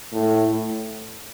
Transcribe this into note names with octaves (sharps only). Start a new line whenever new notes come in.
A2